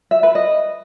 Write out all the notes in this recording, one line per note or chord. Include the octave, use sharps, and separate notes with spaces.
E5
B4
D#5